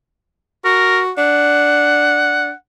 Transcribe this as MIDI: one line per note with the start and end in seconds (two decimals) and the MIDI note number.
0.65 1.11 66
0.65 1.00 70
1.18 2.51 62
1.18 2.54 78